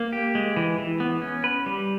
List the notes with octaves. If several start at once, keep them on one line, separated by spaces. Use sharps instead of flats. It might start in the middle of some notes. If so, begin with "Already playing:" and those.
Already playing: A#3
G4
G#3
E3
E3
B3
C#4
B4
G3